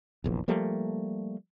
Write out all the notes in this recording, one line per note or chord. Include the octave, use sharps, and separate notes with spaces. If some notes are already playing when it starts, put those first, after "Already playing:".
F1 A#1 E2
F3 G3 A3 A#3